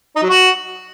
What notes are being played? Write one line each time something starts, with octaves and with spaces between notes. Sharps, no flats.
D#4
F#3
F#4